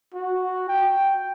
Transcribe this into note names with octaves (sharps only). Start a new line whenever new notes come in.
F#4
G5